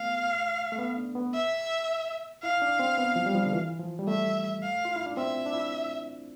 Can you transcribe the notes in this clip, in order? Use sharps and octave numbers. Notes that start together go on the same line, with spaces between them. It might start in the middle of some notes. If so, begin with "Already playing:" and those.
Already playing: A3 B3 F5
A3
B3
D4
B3
E5
E4 F5
D4
C4
B3
F3
G3
F3
D3
E3
F3
G3
A3 E5
F5
F4
E4
D4
C4 E5
D4
E4